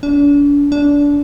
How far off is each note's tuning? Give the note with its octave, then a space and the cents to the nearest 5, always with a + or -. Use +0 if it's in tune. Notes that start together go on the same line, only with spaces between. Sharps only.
D4 -40
D4 -25